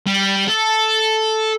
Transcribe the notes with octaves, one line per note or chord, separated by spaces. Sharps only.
G3
A4